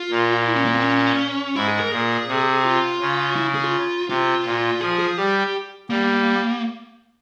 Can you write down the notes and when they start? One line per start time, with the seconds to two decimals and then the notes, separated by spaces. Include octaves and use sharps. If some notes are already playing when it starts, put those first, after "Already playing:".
Already playing: F4
0.11 A#2
0.47 E4
0.56 C#4
0.65 A#3
0.74 C4
0.83 C#4
1.55 G#2 E4
1.68 G#4
1.80 A#4
1.92 A#2 G#4
2.28 C3
2.65 F4
3.00 C#3
3.36 E4
3.55 G#4
3.64 F4
4.09 C3 F4
4.45 A#2
4.81 F3 G#4
4.99 G#4
5.18 G3 G4
5.90 G3 A#3